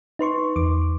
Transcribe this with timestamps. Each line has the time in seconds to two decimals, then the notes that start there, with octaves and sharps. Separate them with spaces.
0.19 D#4 B4 C6 C#6
0.56 E2 D6